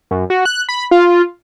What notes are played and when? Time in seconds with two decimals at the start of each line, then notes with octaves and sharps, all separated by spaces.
0.11 F#2
0.30 F#4
0.45 F#6
0.69 B5
0.91 F4